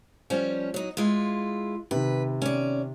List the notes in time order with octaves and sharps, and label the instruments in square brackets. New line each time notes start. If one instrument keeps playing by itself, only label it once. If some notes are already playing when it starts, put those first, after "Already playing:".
[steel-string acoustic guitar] F3 G3 C#4
F#3 D#4
G#3 E4 F4
[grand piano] C3 D#3 [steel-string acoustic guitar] B4
[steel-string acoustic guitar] C#4 D5